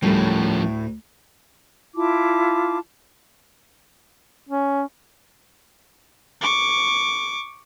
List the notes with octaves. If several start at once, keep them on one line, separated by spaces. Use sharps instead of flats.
D2 A2 F3 G3 A#3 C#4
E4 F4 A5 D6
C#4
C#6 D6